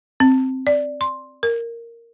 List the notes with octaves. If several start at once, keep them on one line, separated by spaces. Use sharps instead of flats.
C4
D5
C6
A#4